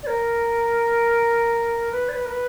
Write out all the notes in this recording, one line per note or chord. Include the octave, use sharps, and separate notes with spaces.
D5
A#4
B4
D5
B4
A#4
B4